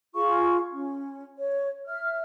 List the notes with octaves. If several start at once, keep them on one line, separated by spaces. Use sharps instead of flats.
F4 G#4 F5 C#6
C#4
C#5
E5 F6